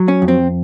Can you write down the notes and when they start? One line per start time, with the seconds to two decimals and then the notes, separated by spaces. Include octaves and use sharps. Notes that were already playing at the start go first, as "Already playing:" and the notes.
Already playing: F#3
0.08 C#4
0.22 F2
0.28 C4